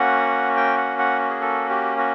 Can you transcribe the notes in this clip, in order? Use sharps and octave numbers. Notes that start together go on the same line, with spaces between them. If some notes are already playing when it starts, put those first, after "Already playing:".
Already playing: A#3 C#4 F#4 F#5
G5
F#5
F#5
G#4
A4
G4
F#4